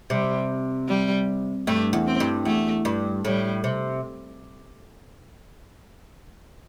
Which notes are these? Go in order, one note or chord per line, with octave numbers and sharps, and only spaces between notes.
C3 G3
G3
G2 A3
E2
C4
G2
E2 A3
G2
A2 G3
C3